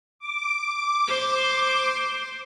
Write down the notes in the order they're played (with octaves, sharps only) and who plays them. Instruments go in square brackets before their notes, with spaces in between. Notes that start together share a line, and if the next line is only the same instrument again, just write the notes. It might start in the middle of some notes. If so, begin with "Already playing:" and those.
[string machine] D6
[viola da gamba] C5